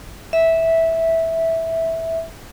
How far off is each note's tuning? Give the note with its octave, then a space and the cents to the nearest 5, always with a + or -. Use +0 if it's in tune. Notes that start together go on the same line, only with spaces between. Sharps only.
E5 -10